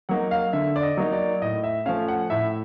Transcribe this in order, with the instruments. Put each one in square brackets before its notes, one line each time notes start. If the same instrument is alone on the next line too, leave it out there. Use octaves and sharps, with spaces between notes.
[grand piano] F#3 A#3 D#4 F#5
F5
D3 E5
D5
D#5
F#3 A#3 D#4
D5
A2 D#5
E5
F3 A3 C#4 F5
F#5
A2 E5